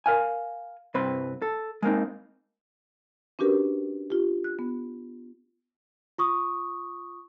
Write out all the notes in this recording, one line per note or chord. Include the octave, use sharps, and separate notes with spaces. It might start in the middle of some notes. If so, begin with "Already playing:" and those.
A#4 F5 G#5
C2 G2 C4 B4 C6
A4
G#3 A#3 C4 D#4
C#4 D4 F#4 G4 A#4 B4
F4 G4
F#6
B3
F4 C#6 D#6